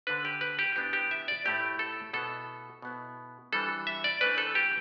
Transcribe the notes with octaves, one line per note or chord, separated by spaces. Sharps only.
D3 A3 D4 B4
G4
B4
G4
A2 E3 B3 D4 G4
G4
E5
D5
A2 A3 E4 G4
A4
B2 B3 E4 A4
B2 B3 E4
E3 G3 D4 A4
E5
D5
E3 A3 D4 B4
A4
G4